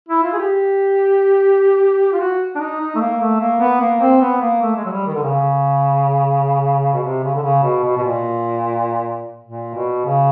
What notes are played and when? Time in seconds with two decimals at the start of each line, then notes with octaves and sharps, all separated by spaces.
0.09 E4
0.23 F4
0.33 G#4
0.39 G4
2.13 F4
2.20 F#4
2.55 D4
2.60 D#4
2.80 D#4
2.95 A3
3.01 A#3
3.20 A3
3.41 A#3
3.60 B3
3.81 A#3
4.01 C4
4.22 B3
4.41 A#3
4.62 A3
4.76 G#3
4.85 F#3
4.92 G3
5.07 D#3
5.15 D3
5.22 C#3
6.94 B2
7.03 C3
7.24 C#3
7.35 D3
7.43 C#3
7.63 B2
7.84 B2
7.97 B2
8.03 A#2
9.44 A#2
9.74 B2
10.05 C#3